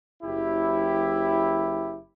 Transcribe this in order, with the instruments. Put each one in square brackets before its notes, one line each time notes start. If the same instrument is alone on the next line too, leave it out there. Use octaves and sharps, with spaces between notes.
[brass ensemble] F#1 E4 G4